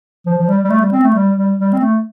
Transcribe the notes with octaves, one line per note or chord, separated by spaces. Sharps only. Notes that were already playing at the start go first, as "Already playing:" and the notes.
F3
F3
G3
G3
A3
G3
C4
A3
G3
G3
G3
C4
A3